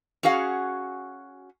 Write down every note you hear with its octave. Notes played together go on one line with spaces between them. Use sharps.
C#4 F#4 G#4 F5 F#5